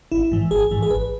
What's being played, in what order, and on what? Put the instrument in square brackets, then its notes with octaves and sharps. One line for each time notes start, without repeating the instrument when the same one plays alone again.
[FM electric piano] G#1 E4
G#2 E3
G#1 G#4
G#2 E3
G#4
G#1 B4